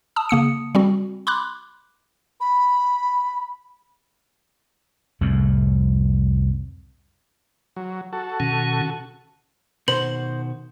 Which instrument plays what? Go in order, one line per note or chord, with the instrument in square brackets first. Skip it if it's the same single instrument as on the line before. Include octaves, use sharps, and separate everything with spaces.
[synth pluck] A5 D#6 E6
C#3 A#3 D#6 C#7
G3 C4 F#4
B5 C6 D6 F#6
[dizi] B5
[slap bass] C2 F2 A2
[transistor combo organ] F#3
F#4 A4
[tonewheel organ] B2 D#3 C#4
[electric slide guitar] B2 D#3 F#4 [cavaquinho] C5 [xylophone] F#7